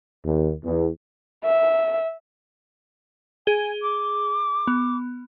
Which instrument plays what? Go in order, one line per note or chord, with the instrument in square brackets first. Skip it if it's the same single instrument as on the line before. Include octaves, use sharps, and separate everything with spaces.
[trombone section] D#2
E2
[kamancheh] E5
[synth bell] G#4 G7 [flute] G#5
[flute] D6
[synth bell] B3